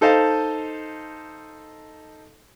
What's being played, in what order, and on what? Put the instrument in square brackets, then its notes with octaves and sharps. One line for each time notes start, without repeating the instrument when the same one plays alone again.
[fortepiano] D#4 A4 C5 D#5 F5 A5